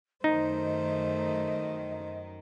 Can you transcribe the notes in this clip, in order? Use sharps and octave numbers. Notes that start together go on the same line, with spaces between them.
F#2 D#3 A3 D#4 C5 D#5